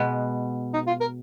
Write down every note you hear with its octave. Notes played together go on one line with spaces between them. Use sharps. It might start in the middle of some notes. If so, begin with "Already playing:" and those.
Already playing: B2 G#3 B3
D#4
F4
A#4